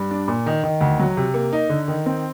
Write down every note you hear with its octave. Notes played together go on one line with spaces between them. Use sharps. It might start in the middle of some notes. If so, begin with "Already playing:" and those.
Already playing: G2
D4
A#2
D#3
D#3
D2
F#3
C3
A#3
D#4
D3
D#3
C4